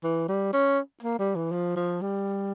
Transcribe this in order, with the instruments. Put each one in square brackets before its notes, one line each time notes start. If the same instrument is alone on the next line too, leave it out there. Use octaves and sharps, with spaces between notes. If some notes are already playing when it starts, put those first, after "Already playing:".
[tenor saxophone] E3
G3
C#4
A#3
G3
E3
F3
F3
G3